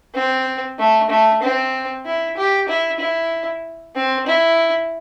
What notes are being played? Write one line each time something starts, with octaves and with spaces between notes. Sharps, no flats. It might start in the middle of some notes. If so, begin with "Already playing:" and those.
C4
A3
A3
C4
E4
G4
E4
E4
C4
E4